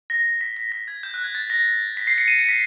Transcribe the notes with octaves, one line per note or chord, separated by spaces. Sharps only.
A#6
B6
B6
A#6
G#6
G6
F#6
G#6
A6
A#6
B6
C7
C#7
D#7
C#7
B6